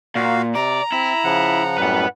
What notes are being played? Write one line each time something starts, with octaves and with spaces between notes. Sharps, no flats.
A#2 F#4 F5
C3 D5 A#5
C4 E4
C#3 F3 F#5
F#2 A2 G3 B4 F#5